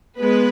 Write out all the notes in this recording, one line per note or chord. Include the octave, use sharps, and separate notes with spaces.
G#3 B3 B4